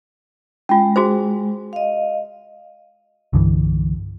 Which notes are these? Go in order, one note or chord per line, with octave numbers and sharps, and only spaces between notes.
G#3 C#4 F4
F#4 G#4 C5
D#5 F5
C2 G2 D3 E3